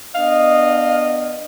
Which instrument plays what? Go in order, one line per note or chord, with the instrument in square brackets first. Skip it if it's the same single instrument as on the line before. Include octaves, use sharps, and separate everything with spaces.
[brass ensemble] B3 D4 D#5 [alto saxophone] F5